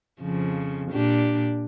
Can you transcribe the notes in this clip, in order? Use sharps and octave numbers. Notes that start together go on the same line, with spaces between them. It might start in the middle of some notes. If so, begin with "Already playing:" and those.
F2 C#3 F3
A#2 D4 G4